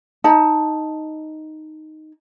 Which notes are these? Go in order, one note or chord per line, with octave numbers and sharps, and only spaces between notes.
D#4 A5